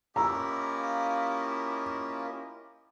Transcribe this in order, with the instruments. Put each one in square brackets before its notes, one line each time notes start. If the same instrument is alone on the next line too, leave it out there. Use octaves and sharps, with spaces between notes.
[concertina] A#3 C#4 F4 [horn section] E4 G4 D#5 [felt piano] A#5 E6